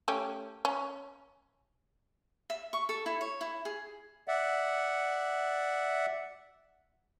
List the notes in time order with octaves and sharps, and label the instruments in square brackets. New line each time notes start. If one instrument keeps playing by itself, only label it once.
[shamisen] A3 C#4 G4
C#4
[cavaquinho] E5
C#6
A4
E4
C#5
E4
G#4
[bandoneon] D5 E5 F#5